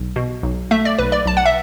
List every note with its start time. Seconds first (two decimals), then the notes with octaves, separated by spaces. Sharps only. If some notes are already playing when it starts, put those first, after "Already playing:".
Already playing: B1
0.16 B2
0.43 B1
0.71 A3 E5
0.85 D5
0.99 B1 B4
1.12 D5
1.26 B1 A5
1.37 F#5
1.45 E5